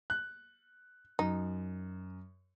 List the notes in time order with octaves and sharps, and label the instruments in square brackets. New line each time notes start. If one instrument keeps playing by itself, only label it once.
[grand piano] F#6
[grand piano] F#2 [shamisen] D#4